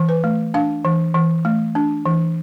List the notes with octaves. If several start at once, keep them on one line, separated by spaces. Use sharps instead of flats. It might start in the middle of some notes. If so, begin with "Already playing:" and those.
Already playing: E3
B4
A3
D4 F5
E3
E3
A3
D4
E3